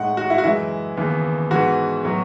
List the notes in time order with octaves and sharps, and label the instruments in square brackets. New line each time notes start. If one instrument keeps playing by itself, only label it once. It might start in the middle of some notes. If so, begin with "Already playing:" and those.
Already playing: [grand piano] A2 G#3 D#4 [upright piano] F#5
[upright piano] F#4
E4
F#4
[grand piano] F#2 C#3 E3 G#3 [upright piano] E4
[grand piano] D#2 C#3 E3 B3
[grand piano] G#2 E3 B3 [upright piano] F#4
[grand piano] A2 F#3 B3